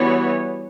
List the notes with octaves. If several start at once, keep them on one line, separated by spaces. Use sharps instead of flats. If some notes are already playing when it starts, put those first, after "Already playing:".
Already playing: E3 G3 B3 F#4 C#5